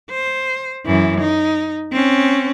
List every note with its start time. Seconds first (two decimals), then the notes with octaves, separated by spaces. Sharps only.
0.11 C5
0.86 F#2 E3
1.20 D#4
1.92 C4 C#4